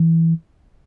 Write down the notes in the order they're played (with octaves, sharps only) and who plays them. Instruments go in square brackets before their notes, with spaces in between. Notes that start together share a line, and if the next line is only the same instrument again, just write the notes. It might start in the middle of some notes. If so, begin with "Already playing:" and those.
Already playing: [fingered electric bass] E3